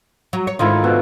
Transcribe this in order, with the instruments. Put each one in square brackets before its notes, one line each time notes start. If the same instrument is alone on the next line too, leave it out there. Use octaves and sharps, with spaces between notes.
[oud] F#3
C#5
[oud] G#2 D3 D#3 [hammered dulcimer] E4 F4
[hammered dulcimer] B2